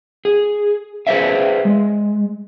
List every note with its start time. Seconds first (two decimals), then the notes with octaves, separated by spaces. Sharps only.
0.25 G#4
1.07 G#4 B4 C5 D5 E5 F5
1.65 G#3